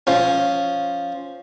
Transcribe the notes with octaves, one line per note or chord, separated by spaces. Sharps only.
F3 C#4